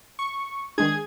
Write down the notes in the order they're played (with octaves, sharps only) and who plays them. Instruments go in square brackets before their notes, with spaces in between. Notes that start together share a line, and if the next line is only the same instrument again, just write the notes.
[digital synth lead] C#6
[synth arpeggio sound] D#3 G#3 D4 [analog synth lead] G#4 [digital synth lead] G#6